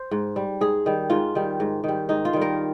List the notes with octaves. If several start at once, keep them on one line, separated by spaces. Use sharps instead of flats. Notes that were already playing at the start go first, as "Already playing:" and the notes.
Already playing: C5
G#2
G3
G#2 G#4
D#3 G3
G#2 F4
D#3 G3
G#2
D#3 G3
G#2 D#4
F4
D#3 G3
A#4